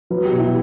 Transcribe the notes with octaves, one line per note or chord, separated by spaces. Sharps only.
F#3 B4
G4
B2
E4